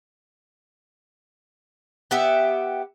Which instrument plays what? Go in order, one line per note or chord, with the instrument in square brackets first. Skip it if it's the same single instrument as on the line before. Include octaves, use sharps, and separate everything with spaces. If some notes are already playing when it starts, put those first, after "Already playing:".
[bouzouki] B3 G4 E5